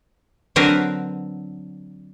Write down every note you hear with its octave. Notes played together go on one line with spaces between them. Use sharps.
D3 F#3 C4 A#4 B4